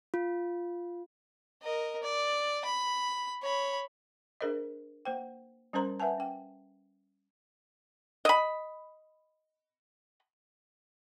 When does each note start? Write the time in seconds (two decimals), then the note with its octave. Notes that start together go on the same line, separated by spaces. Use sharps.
0.14 F4
1.62 A#4 D#5
2.03 D5
2.65 B5
3.42 C#5 B5
4.41 D4 G#4 A#4 C5 D#5
5.05 A#3 C5 G5
5.73 G3 C#4 A#4 C5 A#5 C6
6.00 B4 E5 F#5 G#5 A5
6.18 C#4 G5
8.25 D#5 B5